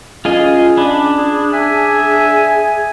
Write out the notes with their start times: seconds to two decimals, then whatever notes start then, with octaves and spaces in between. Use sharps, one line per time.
0.25 C#4 F4 G#4 D#5
0.77 D4 B5
1.17 G#4
1.53 G#4 E5 G#5